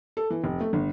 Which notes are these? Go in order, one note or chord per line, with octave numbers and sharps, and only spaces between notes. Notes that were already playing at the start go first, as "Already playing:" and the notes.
A4
E3
F1
A3
G1